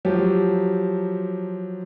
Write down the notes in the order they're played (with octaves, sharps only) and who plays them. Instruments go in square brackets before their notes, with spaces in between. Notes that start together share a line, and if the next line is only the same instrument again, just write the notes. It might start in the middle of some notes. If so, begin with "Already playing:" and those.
[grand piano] F3 F#3 G4